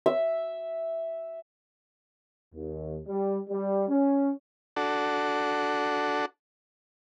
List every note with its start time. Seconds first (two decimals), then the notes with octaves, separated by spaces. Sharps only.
0.06 E5
2.55 D#2
3.07 G3
3.49 G3
3.89 C#4
4.76 D4 F#4 A4